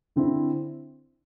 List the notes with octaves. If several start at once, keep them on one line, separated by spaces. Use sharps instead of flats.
D3 C4 E4